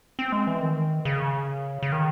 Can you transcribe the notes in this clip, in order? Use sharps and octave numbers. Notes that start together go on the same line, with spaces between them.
C4
G#3
E3
D#3
C#3
C#3
D#3